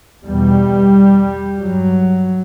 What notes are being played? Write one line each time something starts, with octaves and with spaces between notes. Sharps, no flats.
E2 B2 G3
G2 F#3